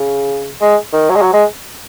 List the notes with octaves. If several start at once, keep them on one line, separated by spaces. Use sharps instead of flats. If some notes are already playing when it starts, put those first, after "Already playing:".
Already playing: C#3
G#3
D#3
F#3
G#3
F#3
G#3